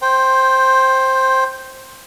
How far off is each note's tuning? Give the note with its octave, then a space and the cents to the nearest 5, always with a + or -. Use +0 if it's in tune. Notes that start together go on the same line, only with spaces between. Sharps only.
C5 +10 G5 +0